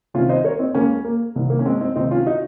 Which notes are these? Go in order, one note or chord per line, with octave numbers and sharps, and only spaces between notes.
C2 C3 D#3 C#4 F4
C5 D#5
A#4 C#5
C4 D#4
C#2 C#3 A#3 C#4
A#3
C2 C3 D#3
A#3
C#4
G#3 C4
C4 D#4
C#2 C3 D#3 C4 D#4
C#4 F4
D#4 F#4